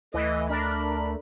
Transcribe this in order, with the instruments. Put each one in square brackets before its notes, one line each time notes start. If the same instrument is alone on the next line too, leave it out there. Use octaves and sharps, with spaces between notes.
[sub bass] D2 [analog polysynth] E3 [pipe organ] A3 [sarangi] D#5
[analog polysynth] D4 A#4 [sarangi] B5